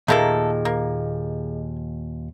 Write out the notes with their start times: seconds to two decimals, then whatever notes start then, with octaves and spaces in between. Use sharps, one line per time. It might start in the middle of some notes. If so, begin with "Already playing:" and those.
0.08 D#2 A#2 A3 A#3 G#4 A4 D#5 A#5
0.65 A#3